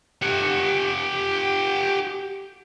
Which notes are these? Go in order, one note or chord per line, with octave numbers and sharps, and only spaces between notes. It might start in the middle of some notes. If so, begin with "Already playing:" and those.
G4 F#5